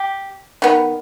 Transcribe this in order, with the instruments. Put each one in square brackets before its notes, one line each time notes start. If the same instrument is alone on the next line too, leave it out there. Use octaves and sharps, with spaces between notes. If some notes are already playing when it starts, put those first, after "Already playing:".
Already playing: [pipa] G4
D#3 B3